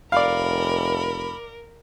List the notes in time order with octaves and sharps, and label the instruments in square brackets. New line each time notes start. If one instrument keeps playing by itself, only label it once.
[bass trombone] F1 [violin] A#4 [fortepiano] D5 F5 [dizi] B5